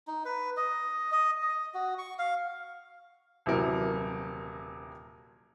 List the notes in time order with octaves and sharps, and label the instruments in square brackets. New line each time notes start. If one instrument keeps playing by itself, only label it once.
[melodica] D#4
B4
D#5
D#5
D#5
F#4
C#6
F5
[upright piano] D#1 C3 E3 F#3 A#4